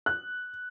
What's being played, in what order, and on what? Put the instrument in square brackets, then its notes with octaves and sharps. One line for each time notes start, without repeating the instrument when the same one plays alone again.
[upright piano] F#6